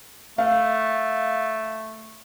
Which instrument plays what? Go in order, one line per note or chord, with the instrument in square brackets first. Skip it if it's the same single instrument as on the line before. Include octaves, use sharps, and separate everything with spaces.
[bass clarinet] A3 [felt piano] F5